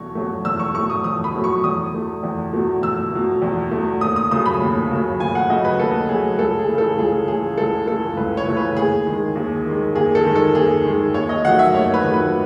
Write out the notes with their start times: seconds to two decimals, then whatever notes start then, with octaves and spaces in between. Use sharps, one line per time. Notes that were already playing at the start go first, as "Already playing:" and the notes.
Already playing: E2 B2 F#3 A3 C#6
0.15 B2 F#3 A3
0.45 E2 E6
0.60 C#6
0.74 B2 F#3 A3 C#6
0.90 D#6
1.04 E2 D#6
1.24 B5
1.34 B2 F#3 A3
1.44 C#6
1.64 E2 D#6
1.93 B2 A3
2.23 E2
2.53 B2 A3
2.82 E2 E6
3.12 B2 A3
3.42 E2
3.71 B2 A3
4.01 D#2 D#6
4.16 D#6
4.31 C#3 F#3 A3 D#6
4.46 B5
4.61 D#2
4.91 C#3 F#3 A3
5.20 D#2 G#5
5.35 F#5
5.50 C#3 F#3 A3 D#5
5.65 B4
5.79 D#2 A4
6.09 C#3 F#3 A3 G#4
6.39 C#2 A4
6.59 G#4
6.69 C#3 E3 A3
6.78 A4
6.98 C#2 G#4
7.28 C#3 E3 A3 G#4
7.58 C#2 A4
7.88 C#3 E3 A3 A4
8.17 C#2 B4
8.37 C#5
8.47 C#3 E3 A3
8.57 B4
8.77 D#2 G#4
9.07 D#3 G#3
9.36 D#2
9.66 D#3 G#3
9.95 D#2 G#4
10.15 A4
10.25 D#3 G#3
10.35 A4
10.55 D#2 G#4
10.85 D#3 G#3
11.14 D#2 C#5
11.29 D#5
11.44 D#3 F#3 A3 F#5
11.59 E5
11.74 D#2 C#5
11.94 B4
12.03 D#3 F#3 A3
12.14 B4